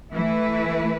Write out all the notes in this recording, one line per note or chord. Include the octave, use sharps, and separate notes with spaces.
E3 A3 E4 B4